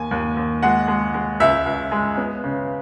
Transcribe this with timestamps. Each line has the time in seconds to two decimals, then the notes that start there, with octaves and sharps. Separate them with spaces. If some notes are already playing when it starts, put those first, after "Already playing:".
Already playing: D#2 G#5
0.11 D#2
0.37 D#2
0.63 G#3 F#5
0.88 G#3
1.14 G#3
1.40 C#2 E5
1.66 C#2
1.92 G#3
2.18 B3
2.44 C#3